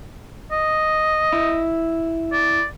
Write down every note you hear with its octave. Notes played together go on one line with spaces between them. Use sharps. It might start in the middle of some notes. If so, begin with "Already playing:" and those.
D#5
E4
D5